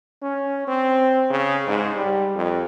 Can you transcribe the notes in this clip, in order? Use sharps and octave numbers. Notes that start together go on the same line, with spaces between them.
C#4
C4
C#3
G#2
G3
F2